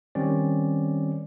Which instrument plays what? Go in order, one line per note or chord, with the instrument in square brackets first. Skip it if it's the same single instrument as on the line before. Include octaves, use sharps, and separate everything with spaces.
[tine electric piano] D#3 G3 C4 C#4 D5